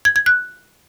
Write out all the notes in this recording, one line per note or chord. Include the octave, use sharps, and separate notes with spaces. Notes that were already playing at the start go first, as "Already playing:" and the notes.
G#6
G#6
F#6